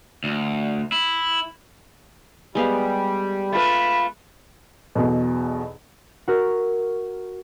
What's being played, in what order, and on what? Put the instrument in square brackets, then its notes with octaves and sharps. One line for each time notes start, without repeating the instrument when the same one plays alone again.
[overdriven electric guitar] D2
E4
[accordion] G3 [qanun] G#3 B3 F5
[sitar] A3 F4 B4 [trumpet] B5
[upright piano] B1 E2 B2
[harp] F#4 A#4